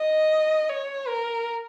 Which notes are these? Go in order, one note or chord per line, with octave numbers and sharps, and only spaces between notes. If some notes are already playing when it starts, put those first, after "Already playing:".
Already playing: D#5
C#5
A#4